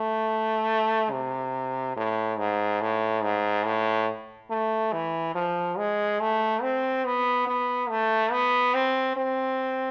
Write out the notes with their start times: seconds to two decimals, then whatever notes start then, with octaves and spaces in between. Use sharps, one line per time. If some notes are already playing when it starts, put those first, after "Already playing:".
Already playing: A3
1.11 C3
1.96 A2
2.38 G#2
2.81 A2
3.23 G#2
3.65 A2
4.50 A3
4.93 E3
5.35 F3
5.77 G#3
6.20 A3
6.62 C4
7.05 B3
7.47 B3
7.90 A3
8.32 B3
8.74 C4
9.16 C4